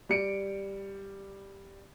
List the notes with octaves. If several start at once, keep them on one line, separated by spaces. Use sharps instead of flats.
G3 C#7 D7